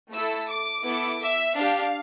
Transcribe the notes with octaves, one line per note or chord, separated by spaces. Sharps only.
A3 E4 A4 E6
D6
B3 E4 A4
E5
D4 G4 F5